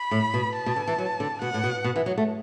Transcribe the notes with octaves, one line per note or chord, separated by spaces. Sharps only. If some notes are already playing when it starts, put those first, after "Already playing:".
Already playing: B5
A2
B2
A5
B2
D3
E3
F#3
D3
B2 F#5
A2
B2
B2
E3
F#3
A3